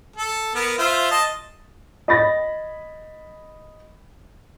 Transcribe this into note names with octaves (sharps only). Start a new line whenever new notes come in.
A4
B3 A#4
F4 C5 E5
D#5 A5
D#5 B5 A6 A#6